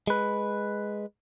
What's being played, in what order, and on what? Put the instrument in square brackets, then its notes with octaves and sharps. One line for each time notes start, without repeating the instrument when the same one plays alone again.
[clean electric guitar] G#3 B4